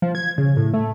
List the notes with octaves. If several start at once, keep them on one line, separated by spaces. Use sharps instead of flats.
F3
G#6
C#3
A2
A3